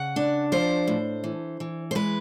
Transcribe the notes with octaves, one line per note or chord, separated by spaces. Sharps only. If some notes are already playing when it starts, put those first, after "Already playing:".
Already playing: C#3 F#5
D4
F3 C5
A2
E3
E3
C5
G#3 B4